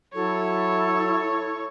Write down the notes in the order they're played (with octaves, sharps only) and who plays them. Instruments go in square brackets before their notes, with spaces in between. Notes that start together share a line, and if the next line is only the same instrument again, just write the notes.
[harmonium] F#3 [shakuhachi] E4 [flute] A4 [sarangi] C#5